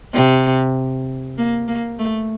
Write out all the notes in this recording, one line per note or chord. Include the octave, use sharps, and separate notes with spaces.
C3
A#3
A#3
A3